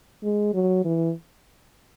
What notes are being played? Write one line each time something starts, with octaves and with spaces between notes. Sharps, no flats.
G#3
F#3
E3